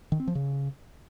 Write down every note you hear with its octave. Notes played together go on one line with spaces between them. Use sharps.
D#3
C4
F3
C#3